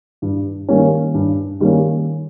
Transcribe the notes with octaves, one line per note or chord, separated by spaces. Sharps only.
G2
D#3 G3 A#3 C#4
G2
D#3 G3 A#3 C#4